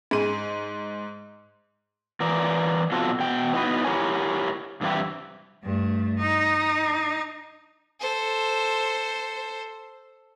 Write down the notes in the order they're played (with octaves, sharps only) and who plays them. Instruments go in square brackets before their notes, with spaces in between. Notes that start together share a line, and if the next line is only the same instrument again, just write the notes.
[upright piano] G#2 G#4 D#7
[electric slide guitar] E3 A#4 D5
B2 F#3 C4 F4 F#4 A4
B2 G5
B3 D#4 E4 F#4 B4
E4 G4 A#4 C#5 G#5
G2 C3 E3 A3 E4 G4
[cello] G2 A3
D#4
[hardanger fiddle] A4 C5